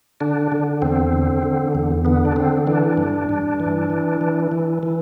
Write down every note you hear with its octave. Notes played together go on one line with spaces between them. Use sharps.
D3 D4
D3
E2 C4
D3
D3
E2
D3 B3
D4
D3 C4
E3 D4
G2
G2
E3
E3
E3
E3
E3